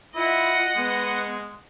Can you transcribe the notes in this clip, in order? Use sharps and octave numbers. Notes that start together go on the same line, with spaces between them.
E4 F4 D#5 F#5
G#3 B3